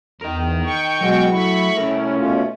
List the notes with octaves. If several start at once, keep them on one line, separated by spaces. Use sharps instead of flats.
E2 A#4 D#5
G5 C#6
B2 F#3 G#3 F#4
A3 E4 B5 C#6
C2 C#4 A#4
B2 A3 F4